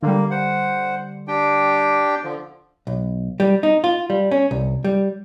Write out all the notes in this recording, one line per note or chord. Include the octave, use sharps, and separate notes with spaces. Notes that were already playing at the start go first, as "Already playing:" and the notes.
D3 G3 A#3
C5 F#5
D4 G4 G5
D3 F3
B1
G3
D#4
F4
G3
C#4
C2
G3